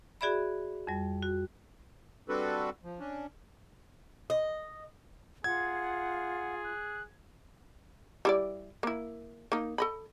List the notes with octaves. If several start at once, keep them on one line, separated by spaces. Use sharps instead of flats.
F#4 G#4 D5 E5 B5
F2 G3
F#4
G3 C4 D4 F#4 A4 B4
F3
C#4 D4
D#5
F4 G#4 F#5 G#6
F#6
G3 E4 D5
A#3 E4
A#3 D#4
A4 D#5 B5